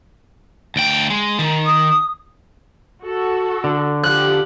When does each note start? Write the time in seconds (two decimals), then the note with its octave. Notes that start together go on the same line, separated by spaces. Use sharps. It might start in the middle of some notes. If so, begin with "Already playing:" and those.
0.76 D2 G5
1.10 G#3
1.39 D#3
1.66 D#6
3.02 F#4 A4
3.64 D3
4.03 F3 G4 F#6